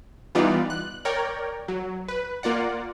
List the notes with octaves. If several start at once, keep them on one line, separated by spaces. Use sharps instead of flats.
E3 G3 B3 D#4 F4 D5
F#6
A#4 C#5 D5 G5
F#3
B4
A#3 F4 D5 F#5